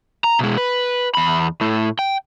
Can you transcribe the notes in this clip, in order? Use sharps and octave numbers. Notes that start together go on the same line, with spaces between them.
A#5
B2 G#3
B4
E2 B5
A2 A3
G5